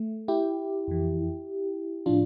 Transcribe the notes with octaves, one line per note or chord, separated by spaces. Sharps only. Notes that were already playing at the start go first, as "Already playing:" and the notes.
Already playing: A3
E4 G4
F2 E3
A2 F3 D4 F4